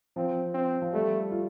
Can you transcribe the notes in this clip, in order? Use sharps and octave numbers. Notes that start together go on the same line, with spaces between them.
F3 C4
C4
F3
G3 A3
F4